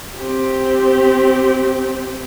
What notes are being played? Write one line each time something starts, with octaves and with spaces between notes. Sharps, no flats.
C4 G4